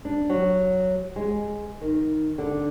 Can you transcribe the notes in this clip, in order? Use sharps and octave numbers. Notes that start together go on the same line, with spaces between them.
D4
F#3
G#3
D#3
D3